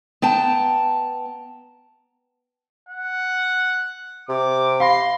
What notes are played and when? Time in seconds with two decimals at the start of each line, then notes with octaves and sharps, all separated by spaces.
0.22 B3 G5 A5 A#5
2.89 F#5
4.29 C3 D6
4.80 F5 B5 C6 A#6